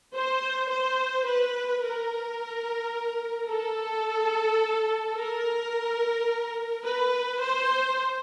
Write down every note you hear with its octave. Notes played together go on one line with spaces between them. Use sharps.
C5
C5
B4
A#4
A4
A#4
B4
C5